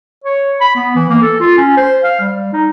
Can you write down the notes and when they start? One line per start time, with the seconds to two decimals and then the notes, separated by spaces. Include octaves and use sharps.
0.24 C#5
0.60 B5
0.76 B3
0.96 E3
1.09 A#3
1.22 A4
1.40 F4
1.57 C#4
1.77 C5
2.04 F5
2.20 G3
2.53 D#4